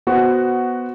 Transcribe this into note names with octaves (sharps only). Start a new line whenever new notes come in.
B3 F#4 C5